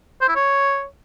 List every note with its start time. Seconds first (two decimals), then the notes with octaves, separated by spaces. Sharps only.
0.21 C5
0.28 E4
0.36 C#5